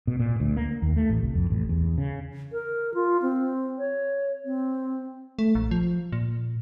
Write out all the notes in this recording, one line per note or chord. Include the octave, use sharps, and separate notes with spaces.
B2
A#2
D2
A#3
D#2
A3
A1
C2
F2
A1
E2
C#3
A#4
F4
C4
C#5
C4
A3
A#1
F3
A#2